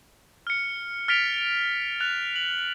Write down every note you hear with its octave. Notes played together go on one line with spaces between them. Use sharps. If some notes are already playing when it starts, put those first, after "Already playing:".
F6 C#7
F6 A6 B6 D7 F7
F#6 A6 F7
F#7